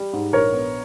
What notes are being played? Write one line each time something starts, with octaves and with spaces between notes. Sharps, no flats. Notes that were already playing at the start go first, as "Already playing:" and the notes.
Already playing: G3
G#2
A#1 A#4 C#5
B3